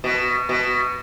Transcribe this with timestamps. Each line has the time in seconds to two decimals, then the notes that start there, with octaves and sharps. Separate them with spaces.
0.04 B2
0.49 B2